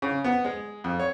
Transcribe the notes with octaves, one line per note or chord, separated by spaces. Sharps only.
C#3
B3
G#3
F2
C#5